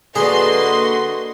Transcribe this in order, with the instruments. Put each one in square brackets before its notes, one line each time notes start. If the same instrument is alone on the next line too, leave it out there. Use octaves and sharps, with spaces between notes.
[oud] D3 [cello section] A#3 F#4 D#5 [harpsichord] G#4 [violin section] B4 C6